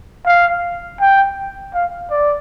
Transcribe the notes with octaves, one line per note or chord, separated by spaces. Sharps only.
F5
G5
F5
D5